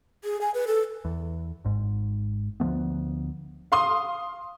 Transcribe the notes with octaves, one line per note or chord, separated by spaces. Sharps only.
G#4
G#5
B4
A4
E2
G#1 G#2
D2 F3 A3 B3
F5 C6 D#6